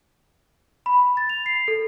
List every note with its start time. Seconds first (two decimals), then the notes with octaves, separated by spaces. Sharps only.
0.86 B5
1.17 A6
1.30 F7
1.46 C7
1.68 A4